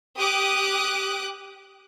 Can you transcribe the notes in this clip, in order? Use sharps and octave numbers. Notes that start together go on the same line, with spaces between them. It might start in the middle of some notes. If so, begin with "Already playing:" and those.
G4 D6 D#6 F#6